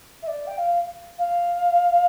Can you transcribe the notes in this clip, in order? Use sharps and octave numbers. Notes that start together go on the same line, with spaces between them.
E5
D5
G5
F5
F5